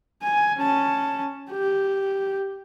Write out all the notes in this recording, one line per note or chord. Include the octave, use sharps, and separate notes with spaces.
G#5
C#4 A5
G4